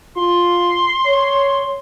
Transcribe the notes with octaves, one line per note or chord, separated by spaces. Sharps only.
F4 C6
C#5